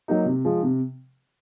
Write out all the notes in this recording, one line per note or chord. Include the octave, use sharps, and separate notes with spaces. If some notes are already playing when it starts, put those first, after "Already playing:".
F#3 A#3 D#4
C3
F3 G#3
C3